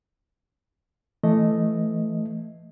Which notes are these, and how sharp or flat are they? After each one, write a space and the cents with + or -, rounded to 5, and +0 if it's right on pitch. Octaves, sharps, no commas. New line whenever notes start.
E3 +20 A3 +0 D#5 +0